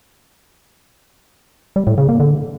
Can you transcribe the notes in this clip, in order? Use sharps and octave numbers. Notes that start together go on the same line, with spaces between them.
G3
A2
C#3
A#3
D3